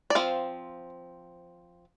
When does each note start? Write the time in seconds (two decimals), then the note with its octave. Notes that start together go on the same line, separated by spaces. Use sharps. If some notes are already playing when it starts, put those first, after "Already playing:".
0.10 D5
0.15 F3 C4 F5